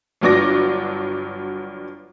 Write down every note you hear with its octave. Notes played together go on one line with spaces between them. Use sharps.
G1 G2 F#3 D4 D6 A#6